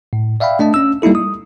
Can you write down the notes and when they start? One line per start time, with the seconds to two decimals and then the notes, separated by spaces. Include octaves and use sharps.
0.13 A2
0.40 D5 E5 F5 G5 B5
0.59 A3 D4 D#5 A5
0.74 C#4 E6
1.02 G3 A#3 D#4 E4 A4
1.15 D#6